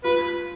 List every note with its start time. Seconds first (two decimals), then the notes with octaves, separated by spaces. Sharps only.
0.04 F4 B4